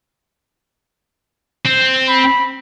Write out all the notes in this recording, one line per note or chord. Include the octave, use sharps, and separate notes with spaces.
C4
B5